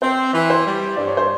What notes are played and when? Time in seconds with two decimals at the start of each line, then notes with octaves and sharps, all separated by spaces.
0.02 C4 C5
0.33 E3
0.50 C5
0.66 G3
0.97 G2 D5
1.07 C#5
1.17 C5